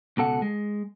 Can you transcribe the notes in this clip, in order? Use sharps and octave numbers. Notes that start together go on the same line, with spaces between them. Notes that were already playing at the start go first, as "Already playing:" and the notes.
C#2 B2 A4 F#5
G#3